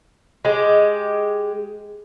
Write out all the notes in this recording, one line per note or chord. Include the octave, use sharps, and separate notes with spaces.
G#3 G4